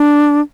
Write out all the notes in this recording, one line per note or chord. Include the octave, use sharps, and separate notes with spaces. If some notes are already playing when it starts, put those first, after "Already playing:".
Already playing: D4